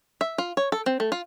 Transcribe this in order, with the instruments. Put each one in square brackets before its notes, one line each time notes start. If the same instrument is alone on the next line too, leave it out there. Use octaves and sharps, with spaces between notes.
[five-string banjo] E5
F4
C#5
A4
C4
A3
F4